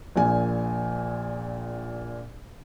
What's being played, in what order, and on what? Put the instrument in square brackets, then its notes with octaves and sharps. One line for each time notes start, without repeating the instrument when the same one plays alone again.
[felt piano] A#1 A#2 G#5